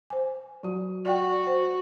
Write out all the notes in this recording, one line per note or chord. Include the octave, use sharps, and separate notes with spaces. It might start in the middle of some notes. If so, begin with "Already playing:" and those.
C5 G#5
F#3 F#4
F#4 D5 F#5 G5
C5